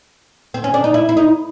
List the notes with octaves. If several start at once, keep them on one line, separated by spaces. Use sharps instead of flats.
C4
C#4
D4
D#4
E4
E4
D#4